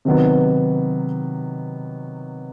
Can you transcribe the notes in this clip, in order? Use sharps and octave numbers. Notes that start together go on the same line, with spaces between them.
C3 D#3 F#3 B3